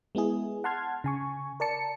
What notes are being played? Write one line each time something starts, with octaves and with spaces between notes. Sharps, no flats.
G#3 B3 E4 G#4
F#5 A5 C6 F6 G#6
C#3 G#5 C#6
A#4 D5 A5 C#7